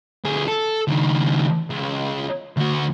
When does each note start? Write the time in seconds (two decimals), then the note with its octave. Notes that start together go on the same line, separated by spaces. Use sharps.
0.25 D2 G#4
0.48 A4
0.88 C#2 D#3
1.70 C#2
2.57 D2 F#4